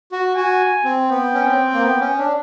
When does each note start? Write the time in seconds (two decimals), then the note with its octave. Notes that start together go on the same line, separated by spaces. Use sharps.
0.12 F#4
0.36 F#4 G#5
0.84 C4
1.09 B3 G5
1.34 C#4
1.46 C4
1.73 A#3
1.81 B3
2.00 C#4
2.18 D4